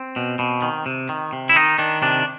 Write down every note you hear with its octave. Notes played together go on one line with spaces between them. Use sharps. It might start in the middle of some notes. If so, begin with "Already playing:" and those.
Already playing: C4
B2
B2
D#3
C3
D#3
C3
E4
D#3 D#4
D#3 D4
C3 D4